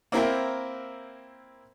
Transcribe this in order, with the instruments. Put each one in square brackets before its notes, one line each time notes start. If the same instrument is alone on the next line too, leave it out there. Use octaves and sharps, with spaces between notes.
[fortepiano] A#3 C4 E4 A#4 E5 G5